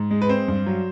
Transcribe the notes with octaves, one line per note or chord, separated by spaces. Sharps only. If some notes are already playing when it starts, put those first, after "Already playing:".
Already playing: G#2
G#3
B4
C4 C5
G2
F#3